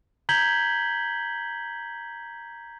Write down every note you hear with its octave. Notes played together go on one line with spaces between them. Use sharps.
A#5 G6 G#6 B6 F#7 G7